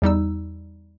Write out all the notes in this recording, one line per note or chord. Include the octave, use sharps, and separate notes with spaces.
E2 G3 D#4 E6